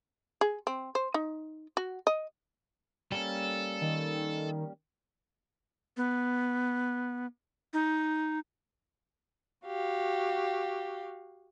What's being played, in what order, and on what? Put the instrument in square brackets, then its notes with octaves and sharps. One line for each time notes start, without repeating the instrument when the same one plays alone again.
[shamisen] G#4
C4
C5
D#4
F#4
D#5
[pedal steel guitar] G3 A#3 C#4 [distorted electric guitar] A4
[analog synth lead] D#3
[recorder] B3
D#4
[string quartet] F#4 G4 F5